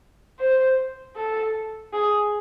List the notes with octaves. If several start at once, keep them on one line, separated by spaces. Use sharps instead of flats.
C5
A4
G#4